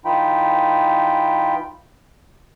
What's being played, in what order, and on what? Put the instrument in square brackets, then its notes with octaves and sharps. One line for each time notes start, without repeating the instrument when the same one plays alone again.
[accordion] E3 D#4 F4 G5 B5